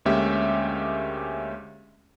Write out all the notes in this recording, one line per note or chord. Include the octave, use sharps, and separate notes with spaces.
D2 G#3 A#3 C#4 G4 E5